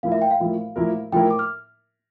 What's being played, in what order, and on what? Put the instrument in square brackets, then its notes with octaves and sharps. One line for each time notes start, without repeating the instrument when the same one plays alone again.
[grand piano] A2 F3 A#3 E4 A#4 [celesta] F5
[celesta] E5
G5
F5
[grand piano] A2 F3 A#3 E4 A#4
A2 F3 A#3 E4 A#4
[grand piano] A2 F3 A#3 E4 A#4 [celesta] G5
[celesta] D6
F6